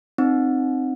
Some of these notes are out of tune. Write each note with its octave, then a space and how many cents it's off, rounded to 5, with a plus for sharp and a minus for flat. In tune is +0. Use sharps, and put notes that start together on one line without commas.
C4 +0 D#4 -20